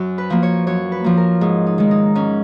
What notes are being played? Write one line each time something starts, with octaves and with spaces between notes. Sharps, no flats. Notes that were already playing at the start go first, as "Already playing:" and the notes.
Already playing: F#2
B4
F3 A#3
C#5
F#2 C#5
B4
F3 A#3
A#4
G#2 G#4
D#4
D#3 G#3
D#4
G#2 C#4